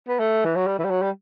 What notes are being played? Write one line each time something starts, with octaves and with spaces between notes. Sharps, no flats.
B3
A3
E3
F#3
G3
E3
G3
F#3
G3